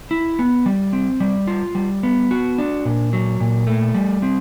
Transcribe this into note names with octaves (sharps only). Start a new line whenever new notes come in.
E4
B3
G3
C4
G3
F4
G3
B3
F#4
D4
A#2
F#3
A#2
A3
G3
C4